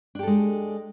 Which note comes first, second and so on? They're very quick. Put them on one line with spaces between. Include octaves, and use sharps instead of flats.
D4 G4 A4 G#3